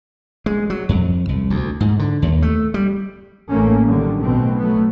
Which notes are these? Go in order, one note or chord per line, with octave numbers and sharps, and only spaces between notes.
G#3
F#3
F2
C2
D2
G#2
D3
D#2
A3
G3
A1 G#2 A3 A#3 C#4
D3 D#3 F#3 G3
B1 B2 A3 C4
F#3 A3 B3